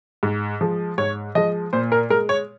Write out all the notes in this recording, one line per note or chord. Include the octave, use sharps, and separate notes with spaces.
G#2
F3 G#3
G#2 C#5
F3 G#3 D#5
A#2 C5
A#4
G#3 A#4
C#5